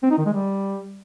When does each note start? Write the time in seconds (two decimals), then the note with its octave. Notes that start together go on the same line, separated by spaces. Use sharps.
0.03 C4
0.11 D#4
0.18 D#3
0.26 G#3
0.33 G3